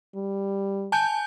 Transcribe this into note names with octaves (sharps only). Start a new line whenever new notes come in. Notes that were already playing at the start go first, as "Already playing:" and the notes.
G3
G#5 A5 G6